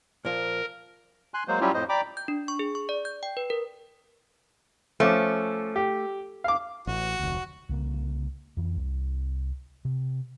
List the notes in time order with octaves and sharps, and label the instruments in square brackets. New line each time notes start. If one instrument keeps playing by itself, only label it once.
[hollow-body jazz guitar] A#2 F3 [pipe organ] A#4
[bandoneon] G#5 C6 F#6
F#3 G#3 A#3 C5
F#3 G3 C#4 E4 F4 G4
F2 A2 C5 D#5
D5 G5 A#5 B5 D6
[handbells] G6
D4
C#6
G#4
C#6
D5
G6
G5
B4
A#4
[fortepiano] F3 C#4 D6 [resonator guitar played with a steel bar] A3
[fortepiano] G4
F5 D6
[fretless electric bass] A1 [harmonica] F#4
[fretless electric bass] F1 D2
[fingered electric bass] C2 C#3 A#3
F2 E3
C2
C3